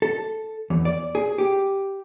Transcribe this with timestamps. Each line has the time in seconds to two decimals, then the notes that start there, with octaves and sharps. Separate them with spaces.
0.02 A4
0.70 E2
0.85 D5
1.15 G#4
1.38 G4